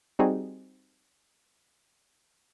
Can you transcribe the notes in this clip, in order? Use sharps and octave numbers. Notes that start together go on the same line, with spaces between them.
G3 C4 D#4 F#4 G#4